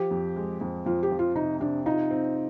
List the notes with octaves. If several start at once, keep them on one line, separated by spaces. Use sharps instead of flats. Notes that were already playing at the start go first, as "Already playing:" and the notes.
Already playing: F3 G4
F2
G#3
F2
F2 F4
G4
F3
F4
C3 D#4
C3 D4
D#4 F4
C4